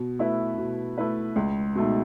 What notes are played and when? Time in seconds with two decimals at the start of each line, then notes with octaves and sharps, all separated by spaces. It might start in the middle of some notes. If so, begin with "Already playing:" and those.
Already playing: B2
0.19 A3 E4 B4
0.58 B2
0.98 A3 E4 B4
1.36 C#2
1.75 B2 A3 D#4